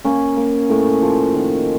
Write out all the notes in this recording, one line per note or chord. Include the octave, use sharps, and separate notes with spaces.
A#3 C#4
A#3
A2
F3
D#3